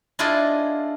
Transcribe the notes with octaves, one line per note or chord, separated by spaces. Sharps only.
D4 E4 F4 G#4 D5 D#5